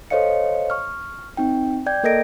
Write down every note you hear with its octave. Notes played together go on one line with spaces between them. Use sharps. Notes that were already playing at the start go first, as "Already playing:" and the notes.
A4 C5 C#5 D#5 F5 C#7
C#6 F6
C4 D#4 G5
D5 G5 G6 G#6
A#3 A4 A#4 D#5 A#6 D7